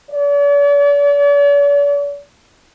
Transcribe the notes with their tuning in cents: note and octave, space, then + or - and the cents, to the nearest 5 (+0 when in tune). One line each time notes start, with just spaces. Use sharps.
D5 -45